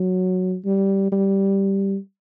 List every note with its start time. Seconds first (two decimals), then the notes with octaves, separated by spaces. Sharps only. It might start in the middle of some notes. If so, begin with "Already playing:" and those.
Already playing: F#3
0.65 G3
1.12 G3